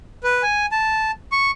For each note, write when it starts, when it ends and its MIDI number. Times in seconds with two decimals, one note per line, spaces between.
0.24 0.42 71
0.43 0.66 80
0.72 1.11 81
1.32 1.51 85